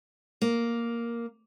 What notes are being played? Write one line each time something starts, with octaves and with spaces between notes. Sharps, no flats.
A#3